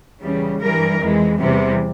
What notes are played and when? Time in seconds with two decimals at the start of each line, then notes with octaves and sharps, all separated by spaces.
0.22 E2 C#3 G3
0.60 G2 E3 G3 A#4
1.00 F2 E3 G#3
1.39 E2 C3 E3 G3